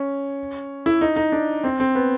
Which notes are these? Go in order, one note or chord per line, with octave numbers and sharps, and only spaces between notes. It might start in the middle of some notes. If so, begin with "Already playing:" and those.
Already playing: C#4
E4
D#4
D#4
D4
C4
C4
B3